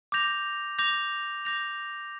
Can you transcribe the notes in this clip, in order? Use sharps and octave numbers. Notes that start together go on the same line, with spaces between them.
D6 G6 A#6 F7
D6 G6 A#6 F7
D6 G6 A#6 F7